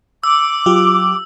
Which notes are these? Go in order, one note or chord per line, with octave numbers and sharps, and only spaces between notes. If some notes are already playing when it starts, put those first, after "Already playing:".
D6 E6
F#3 F4 G4